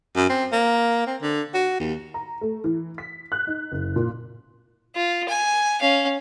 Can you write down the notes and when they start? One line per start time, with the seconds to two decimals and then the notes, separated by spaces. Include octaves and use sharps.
0.16 F#2
0.30 C4
0.52 A#3
1.07 C4
1.22 D3
1.54 F#4
1.80 D#2
2.14 A#5
2.41 A3
2.64 E3
2.98 B6
3.32 F#6
3.47 D#4
3.72 F#1
3.96 A#2
4.95 F4
5.29 G#5
5.82 C#4 F5